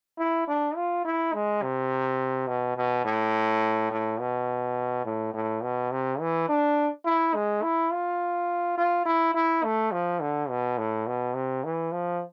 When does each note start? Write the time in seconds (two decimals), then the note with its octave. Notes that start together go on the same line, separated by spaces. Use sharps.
0.19 E4
0.48 D4
0.76 F4
1.05 E4
1.33 G#3
1.62 C3
2.48 B2
2.77 B2
3.05 A2
3.91 A2
4.20 B2
5.05 A2
5.34 A2
5.63 B2
5.91 C3
6.20 E3
6.49 D4
7.05 E4
7.35 G#3
7.62 E4
7.92 F4
8.78 F4
9.06 E4
9.35 E4
9.64 A3
9.92 F3
10.21 D3
10.49 B2
10.78 A2
11.07 B2
11.35 C3
11.64 E3
11.92 F3